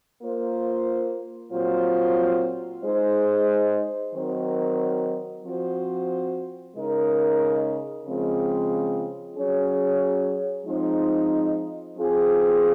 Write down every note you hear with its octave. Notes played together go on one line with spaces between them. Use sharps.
A#3 F4 C5
A#2 F#3 C4 F4 C5
G#3 D#4 G#4 C5
D#3 F#3 C4 D#4 A#4
F3 C4 F#4 C5
C#3 G#3 D#4 A#4
C#3 F3 G#3 C4
F#3 C#4 G#4 C#5
F3 G#3 C4 D#4
F3 C4 F4 G#4 C5